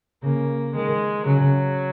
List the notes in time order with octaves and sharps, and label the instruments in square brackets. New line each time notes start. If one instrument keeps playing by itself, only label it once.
[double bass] C#3 [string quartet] A#3
[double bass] D#3 [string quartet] G#3
[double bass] C#3 [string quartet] F#3